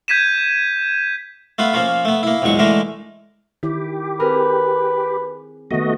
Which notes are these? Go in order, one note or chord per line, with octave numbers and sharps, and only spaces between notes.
G6 G#6 B6 D#7 E7
A3 B3 F4 B4
F3 A#3 C#4 F4
A3 B3
A#3 E4
A#1 E2 F#3 G#3 C#6
D3 E3 G#3 A3 A#4
D#3 E4 G4
C4 G#4 A#4 B4
D#3 A3 B3 F#4 D#5